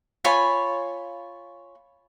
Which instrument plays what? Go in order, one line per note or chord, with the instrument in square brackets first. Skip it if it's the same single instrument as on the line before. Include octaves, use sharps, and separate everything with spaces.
[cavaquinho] F4 C#5 G#5 B5